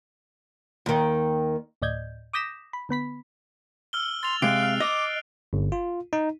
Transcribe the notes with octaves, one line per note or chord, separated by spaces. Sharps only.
D#2 D#3
D2 A2 D5 D#5 G6 G#6
D6 D#6 G6 A#6 B6 E7
B5
D3 B3 B5 B6
E6 F6 G7
C6 A6 F7
C3 G#3 F5 F#6 C7 D7
F6
D#5 D6
G1
F4
D#4